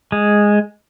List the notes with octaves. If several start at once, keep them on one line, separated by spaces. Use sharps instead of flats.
G#3